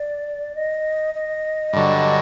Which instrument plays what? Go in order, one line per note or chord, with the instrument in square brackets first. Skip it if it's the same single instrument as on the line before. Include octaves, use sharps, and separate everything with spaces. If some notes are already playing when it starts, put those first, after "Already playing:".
Already playing: [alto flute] D5
D#5
D#5
[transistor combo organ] G2 D3 F#3